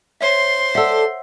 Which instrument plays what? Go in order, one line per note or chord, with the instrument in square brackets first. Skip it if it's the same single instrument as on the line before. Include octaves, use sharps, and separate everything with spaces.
[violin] C5 C6 [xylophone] C#5 E5
[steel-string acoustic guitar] A4 D5 [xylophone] E5 F#5 E6